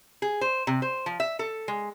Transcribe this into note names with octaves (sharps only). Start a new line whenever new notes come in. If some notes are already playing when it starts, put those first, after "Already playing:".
G#4
C5
C3
C5
F3
E5
A4
G#3